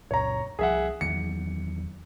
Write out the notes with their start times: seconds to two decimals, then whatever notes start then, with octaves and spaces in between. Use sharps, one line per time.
0.11 C#2 F#2 A#2 C#5 A#5
0.59 C2 F3 G#4 E5 F#5
1.01 E2 D#3 F#3 C#7